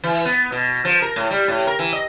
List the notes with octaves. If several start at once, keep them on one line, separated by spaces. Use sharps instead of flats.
E3
B3
B2
F3
A#4
A2
G3
A2
A#4
E3
D#5